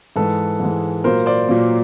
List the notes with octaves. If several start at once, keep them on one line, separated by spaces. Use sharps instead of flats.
G#2 E3 G#3 A4 B4
G#2 E3 G#3
A#2 F#3 A#3 A#4 C5
C5 D5
A#2 F#3 A#3